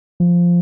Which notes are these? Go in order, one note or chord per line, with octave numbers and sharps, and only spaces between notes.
F3